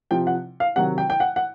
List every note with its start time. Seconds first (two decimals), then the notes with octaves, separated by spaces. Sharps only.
0.11 C3 F3 G5
0.27 F#5
0.60 F5
0.76 C3 D#3 F#3 F#5
0.98 G5
1.10 G5
1.20 F#5
1.36 F#5